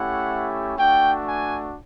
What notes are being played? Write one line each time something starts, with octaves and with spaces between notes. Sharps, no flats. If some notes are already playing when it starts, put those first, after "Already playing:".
Already playing: A3 C#4 E4 G4 F#5
A3 D4 F#4 G5
G#5